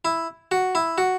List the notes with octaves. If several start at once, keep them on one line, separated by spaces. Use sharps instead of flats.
E4
F#4
E4
F#4